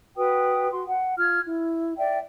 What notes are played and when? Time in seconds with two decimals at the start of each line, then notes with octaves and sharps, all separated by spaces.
0.17 F#4 B4 G5 D#6
0.71 F#4 C6
0.86 F#5
1.18 F4 F6 G#6
1.47 E4
1.98 D5 E5 G5